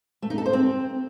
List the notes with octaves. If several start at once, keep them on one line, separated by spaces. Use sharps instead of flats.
A3
D#4
A4
C5
C4